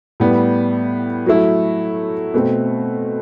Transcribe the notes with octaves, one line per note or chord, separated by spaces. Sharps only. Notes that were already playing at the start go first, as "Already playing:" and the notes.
A2 G3 B3
F#3 A3 E4
B2 A3 C4